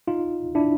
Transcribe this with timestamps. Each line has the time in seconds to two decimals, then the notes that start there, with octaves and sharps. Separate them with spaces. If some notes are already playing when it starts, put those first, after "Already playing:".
0.07 D#4 F4
0.55 D4 E4